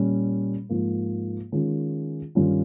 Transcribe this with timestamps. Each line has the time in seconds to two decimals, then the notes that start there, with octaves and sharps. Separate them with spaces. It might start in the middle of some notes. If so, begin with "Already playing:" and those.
Already playing: A#2 G3 C#4
0.69 G#2 F3 A#3
1.52 D#3 G#3 C#4 F4
2.35 G2 D#3 G3 C#4 F4